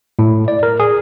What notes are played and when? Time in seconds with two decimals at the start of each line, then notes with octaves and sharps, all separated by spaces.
0.19 A2
0.48 D5
0.63 A#4
0.80 G#4